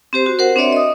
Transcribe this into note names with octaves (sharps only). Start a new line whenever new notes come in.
C4 G4 C5
F#4
A#4 C5 F#5
C4 D4 C#5 D5 E5
D#5 D#6